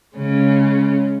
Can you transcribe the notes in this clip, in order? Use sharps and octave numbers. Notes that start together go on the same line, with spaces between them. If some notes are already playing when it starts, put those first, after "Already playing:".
C#3 G#3 C#4